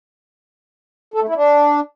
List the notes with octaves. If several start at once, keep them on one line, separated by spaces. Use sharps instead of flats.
A4
A3
E4
D4